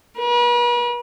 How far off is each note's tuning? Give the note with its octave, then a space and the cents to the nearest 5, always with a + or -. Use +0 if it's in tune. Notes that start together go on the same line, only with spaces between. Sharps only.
B4 -40